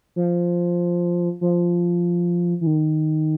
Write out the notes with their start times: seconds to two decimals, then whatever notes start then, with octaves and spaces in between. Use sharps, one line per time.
0.16 F3
1.41 F3
2.61 E3
2.67 D#3